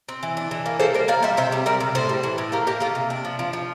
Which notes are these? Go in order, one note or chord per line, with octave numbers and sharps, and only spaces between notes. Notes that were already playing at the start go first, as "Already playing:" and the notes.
C4
E3
D4
E3
A#3
A#3 A4 C5
G3 A#4 D5
A#3 D5 F5
G3 C5 E5
C3 C5 E5
G3
G3 A#4 D5
C3
A2 A4 C5
G3
E3
A2
A#3 G4 A#4
A#3 G4
A#3 F4 A4
C3
D4
F3
F3
F3